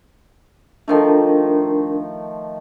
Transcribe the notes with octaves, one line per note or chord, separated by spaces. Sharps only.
D#3 F3 A3 D4 A#4